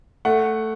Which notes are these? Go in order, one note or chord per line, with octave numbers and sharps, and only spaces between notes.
A3 F#5